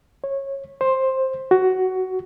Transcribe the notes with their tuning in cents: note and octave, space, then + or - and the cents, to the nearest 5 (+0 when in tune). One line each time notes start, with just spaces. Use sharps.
C#5 -20
C5 +10
F#4 +15